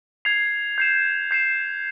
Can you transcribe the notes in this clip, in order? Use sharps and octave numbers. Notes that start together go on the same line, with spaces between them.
G#6 C7 F7
G6 C7 E7
G6 C7 E7